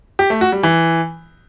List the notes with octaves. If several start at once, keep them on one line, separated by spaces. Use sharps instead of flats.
G4
A3
F#4
G3
E3